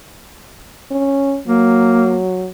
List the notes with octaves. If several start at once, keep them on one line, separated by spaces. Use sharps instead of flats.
C#4
F#3 A#3